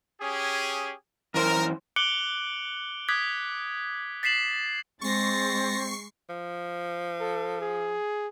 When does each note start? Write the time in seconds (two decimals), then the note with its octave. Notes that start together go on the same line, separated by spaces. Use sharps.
0.21 C#4 G4 G#4
1.34 F#2 E3 A#4 C5
1.96 D6 F#6 C#7 D7 F#7 G7
3.08 D6 D#6 F#6 G#6 B6
4.23 A6 B6 C7 E7 F#7
5.01 G#3 C4 C#6 A6 A#6 C7
6.29 F3
7.20 A4
7.61 G#4